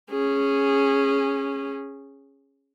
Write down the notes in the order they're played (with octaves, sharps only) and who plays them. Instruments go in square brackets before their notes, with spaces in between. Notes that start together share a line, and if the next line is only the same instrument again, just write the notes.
[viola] C#4 G#4